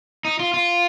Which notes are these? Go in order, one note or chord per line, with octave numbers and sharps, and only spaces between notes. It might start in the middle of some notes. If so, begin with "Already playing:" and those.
D#4
F4
F4